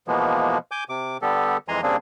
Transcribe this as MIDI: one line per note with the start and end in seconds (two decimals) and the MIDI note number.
0.08 0.58 47
0.08 0.58 52
0.08 0.58 53
0.08 0.58 56
0.08 0.58 58
0.08 0.58 59
0.71 0.84 80
0.71 0.84 86
0.71 0.84 91
0.89 1.17 48
0.89 1.17 86
1.22 1.57 50
1.22 1.57 55
1.22 1.57 59
1.22 1.57 67
1.22 1.57 69
1.68 1.81 41
1.68 1.81 52
1.68 1.81 56
1.68 1.81 80
1.68 1.81 82
1.68 1.81 84
1.83 1.96 49
1.83 1.96 55
1.83 1.96 58
1.83 1.96 60
1.83 1.96 62
1.83 1.96 68